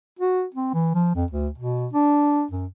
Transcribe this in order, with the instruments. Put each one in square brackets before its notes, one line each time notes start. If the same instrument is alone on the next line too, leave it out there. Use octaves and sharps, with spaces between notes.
[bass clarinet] F#4
C4
E3
F3
F2
D2
B2
D4
F#2